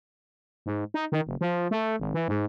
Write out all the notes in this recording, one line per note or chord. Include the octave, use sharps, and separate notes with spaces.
G#2
D#4
D#3
F#1
F3
A3
G#1
E3
G#2